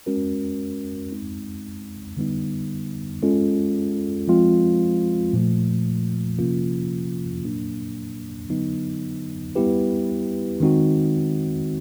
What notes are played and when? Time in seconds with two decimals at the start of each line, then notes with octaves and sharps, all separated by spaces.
0.06 G#3 C#4 F#4 A#4
1.12 G#3 C4 D#4
2.17 D3 G3 B3 D#4
3.23 G#3 C#4 F4 A4
4.28 F3 G#3 C4 F4
5.33 A#2 F3 A3
6.39 C3 F3 A#3 C#4 F4
7.44 A#2 F#3 A#3 D4
8.50 D3 F#3 B3 D#4
9.55 G3 B3 E4 G4 B4
10.60 D#3 G#3 C4 D#4 F#4